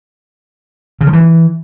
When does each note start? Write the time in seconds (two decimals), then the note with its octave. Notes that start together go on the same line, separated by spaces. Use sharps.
1.01 C#3
1.07 F3
1.13 E3